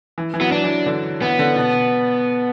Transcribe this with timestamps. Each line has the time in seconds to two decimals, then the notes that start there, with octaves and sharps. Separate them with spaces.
0.18 E3
0.34 E3
0.40 F#3 B3
0.52 D4
0.64 E3
0.86 D3
1.21 E3 B3
1.39 D3
1.56 B2